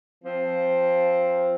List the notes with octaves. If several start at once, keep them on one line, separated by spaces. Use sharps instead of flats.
F3 C4